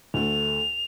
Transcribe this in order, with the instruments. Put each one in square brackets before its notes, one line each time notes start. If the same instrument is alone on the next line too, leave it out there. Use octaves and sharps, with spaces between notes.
[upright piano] D2 A3 [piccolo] F7